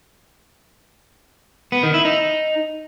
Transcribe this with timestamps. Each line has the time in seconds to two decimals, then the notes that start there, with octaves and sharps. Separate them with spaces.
1.72 B3
1.83 D#3
1.94 E4
2.05 D#4